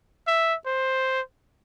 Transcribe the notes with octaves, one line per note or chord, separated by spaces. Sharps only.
E5
C5